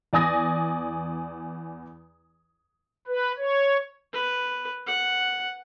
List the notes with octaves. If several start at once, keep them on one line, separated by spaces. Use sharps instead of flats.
E2 D5 G#5 D#6 A#6
B4
C#5
B4
F#5